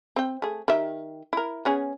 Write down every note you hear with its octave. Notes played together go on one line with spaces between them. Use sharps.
C4 G5
A3 G#4
D#3 G4 E5
E4 A#4
B3 C#4 G#4